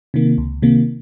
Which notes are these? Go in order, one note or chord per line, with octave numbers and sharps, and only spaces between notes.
C3 D#3 A#3
C#2
C3 D#3 A#3